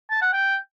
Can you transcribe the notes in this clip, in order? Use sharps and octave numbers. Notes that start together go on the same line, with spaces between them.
A5
F#5
G5